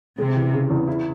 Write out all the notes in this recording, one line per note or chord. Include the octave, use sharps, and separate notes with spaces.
C3 G#3
E3
C#3
E2
E4